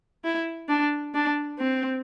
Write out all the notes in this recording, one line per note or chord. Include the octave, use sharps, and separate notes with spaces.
E4
D4
D4
C4